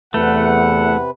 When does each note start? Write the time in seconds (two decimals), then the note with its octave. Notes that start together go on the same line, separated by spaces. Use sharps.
0.14 E2 C3 A3 B4 F#5